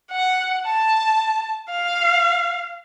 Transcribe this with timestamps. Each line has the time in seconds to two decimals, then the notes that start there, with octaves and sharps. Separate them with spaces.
0.11 F#5
0.67 A5
1.69 F5